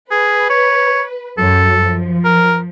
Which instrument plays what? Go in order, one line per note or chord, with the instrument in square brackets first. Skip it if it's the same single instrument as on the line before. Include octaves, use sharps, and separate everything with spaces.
[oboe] G#4 [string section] B4
[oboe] C#5
[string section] F#2 F#3 [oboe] A4
[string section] F3
[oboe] A#4